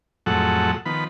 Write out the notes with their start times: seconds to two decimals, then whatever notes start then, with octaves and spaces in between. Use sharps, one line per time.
0.26 F2 A2 F#3 G#3 A4 F#5
0.86 D#3 F3 B3 B5